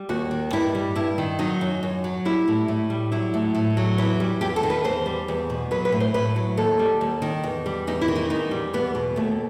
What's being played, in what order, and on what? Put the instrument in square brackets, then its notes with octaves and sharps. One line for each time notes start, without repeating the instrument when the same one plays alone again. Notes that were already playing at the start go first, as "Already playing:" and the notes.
Already playing: [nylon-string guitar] G3
D#2 F#4
D#3
G2 E4
G3
G2 E4
D#3
F#3 D#4
F#2
F#2
F#3
G3 E4
A2
A2
G3
F#3 E4
A2
A2
F#3
E2 E4
G3
E2 G4
A4
D#3
B4
E2 C5
G3
E2
B2
F#3 B4
B4
A2
C5
A2 B4
F#3
D#2 A4
G3
D#2
D#3
E2
G3
E2 D#4
E4
D#3
D#4
E2 D#4
G3
E2 B3
B2
D#2 A3